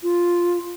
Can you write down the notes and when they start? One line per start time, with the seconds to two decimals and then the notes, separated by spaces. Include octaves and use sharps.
0.03 F4